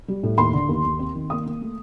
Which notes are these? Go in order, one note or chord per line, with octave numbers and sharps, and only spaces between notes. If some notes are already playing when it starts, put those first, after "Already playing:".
G3
A2
D#2 C6
D3
D#2
D#2
C4
D#3
A#3 D#6
A#3
A3